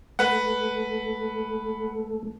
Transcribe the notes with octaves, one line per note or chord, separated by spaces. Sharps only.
A3 B4 F#5